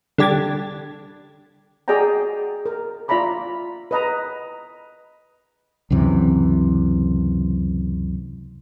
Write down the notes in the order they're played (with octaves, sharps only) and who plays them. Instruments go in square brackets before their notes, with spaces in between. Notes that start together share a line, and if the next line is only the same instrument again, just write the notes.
[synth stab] D3 G3 G4 G#6 A6
[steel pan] F#4 G#4 D5 D#5 G5 A#5
A#4
F4 D5 E5 A#5 B5 D6
B4 D#5 A#5
[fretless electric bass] C#2 F#2 C3 E3